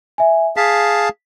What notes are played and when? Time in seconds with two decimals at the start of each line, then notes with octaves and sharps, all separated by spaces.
0.18 E5 G#5
0.57 G#4 F5 A5 B6